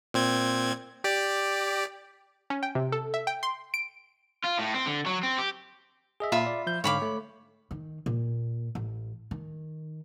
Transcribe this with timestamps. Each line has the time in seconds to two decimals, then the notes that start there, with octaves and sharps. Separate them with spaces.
0.14 A#2 C4 G#6
1.04 G4 D5
2.50 C#4
2.63 G5
2.75 C3
2.92 A4
3.14 E5
3.27 G5
3.43 C6
3.74 D7
4.44 F4
4.59 A2
4.74 C4
4.86 D3
5.06 F#3
5.23 C4
5.38 G4
6.20 G#4 D#5 E5
6.32 A#2 F4 E5 B5
6.46 D5
6.67 F3 G6
6.84 G#2 D3 C#5 F5 B5 D6
7.02 A3
7.71 D#3
8.06 A#2
8.75 A1
9.31 D#3